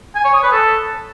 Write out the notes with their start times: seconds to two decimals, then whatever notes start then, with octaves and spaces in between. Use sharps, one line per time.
0.15 G#5
0.25 C#5
0.34 D#6
0.43 B4
0.52 A4